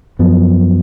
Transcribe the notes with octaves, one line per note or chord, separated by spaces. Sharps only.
F#2 F3 B3